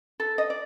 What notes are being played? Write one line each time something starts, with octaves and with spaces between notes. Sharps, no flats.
A4
D#5
D5